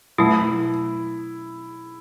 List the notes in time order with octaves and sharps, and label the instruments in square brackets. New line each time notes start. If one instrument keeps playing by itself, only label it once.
[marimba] B2 F#3 A3 [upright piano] E4